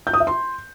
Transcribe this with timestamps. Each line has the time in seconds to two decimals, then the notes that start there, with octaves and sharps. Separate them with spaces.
0.07 G6
0.13 D#6
0.20 E5
0.27 C6